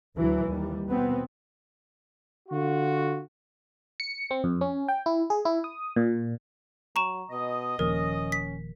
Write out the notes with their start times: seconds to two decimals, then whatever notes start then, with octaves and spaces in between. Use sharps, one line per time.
0.18 D2 E3 F#3
0.48 D#2 G3
0.89 B2 B3 C4
2.49 D3 F4 F#4
4.00 C#7
4.31 C4
4.44 F2
4.61 C#4
4.88 G5
5.06 E4
5.30 G#4
5.45 E4
5.64 D#6
5.96 A#2
6.96 F#3 A#5 C#6 E7
7.30 B2 D#5 D#6
7.79 D#1 D#2 F3 C#4 A#4
8.32 B6